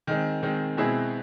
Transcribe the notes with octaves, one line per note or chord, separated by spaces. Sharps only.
D#3 G#3 C4
D#3 G#3 C4
B2 G#3 C4 E4 G#4